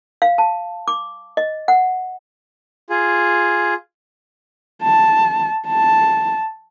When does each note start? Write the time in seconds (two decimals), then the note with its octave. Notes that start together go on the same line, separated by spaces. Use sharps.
0.22 F5
0.38 A5
0.88 D6
1.37 D#5
1.68 F#5
2.90 F4 G#4
4.83 A5
5.68 A5